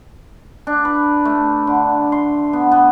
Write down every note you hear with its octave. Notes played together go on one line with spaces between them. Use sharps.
D4
B4
A3
D3
C6
B3
B3